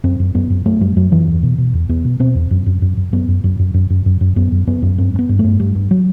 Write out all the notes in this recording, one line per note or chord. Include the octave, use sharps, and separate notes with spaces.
F#2 C4
F#2
F#2 B3
F#2
F#2 A3
F#2 G3
F#2 F#3
F#2 E3
E2
B2
B2
E2
E2 B3
B2
B2 C4
E2
F#2
F#2
F#2
F#2
F#2 B3
F#2
F#2
F#2
F#2
F#2
F#2
F#2
F#2 B3
F#2
F#2 B3
F#2
G2 C4
G2
B3
G2
A3
G2
G2 G3
G2
F#3